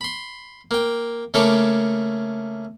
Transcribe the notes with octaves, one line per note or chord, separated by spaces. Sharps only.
B5 C6
A#3 G5
C#3 A3 A#3 A4 C#5 D6